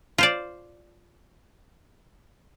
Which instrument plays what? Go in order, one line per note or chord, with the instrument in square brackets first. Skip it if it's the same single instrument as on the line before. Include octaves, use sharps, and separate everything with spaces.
[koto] F4 C5 D5